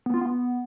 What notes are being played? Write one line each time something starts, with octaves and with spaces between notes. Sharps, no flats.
B3
F4
B3